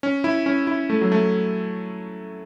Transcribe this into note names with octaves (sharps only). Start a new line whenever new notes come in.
C#4
E4
C#4
E4
A3
F#3
A3